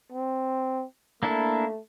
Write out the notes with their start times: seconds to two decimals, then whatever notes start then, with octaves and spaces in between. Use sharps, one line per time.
0.12 C4
1.23 A3 A#3 D4 E4